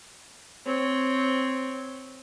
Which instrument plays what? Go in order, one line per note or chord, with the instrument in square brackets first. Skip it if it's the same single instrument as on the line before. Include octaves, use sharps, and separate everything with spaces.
[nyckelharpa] C4 C#5